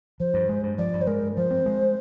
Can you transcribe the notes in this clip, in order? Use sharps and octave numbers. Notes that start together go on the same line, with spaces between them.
F3 C5
G2
G#3
G2
F3 D5
G2
C5
G#3 A#4
G2
F3 C5
C4
G#3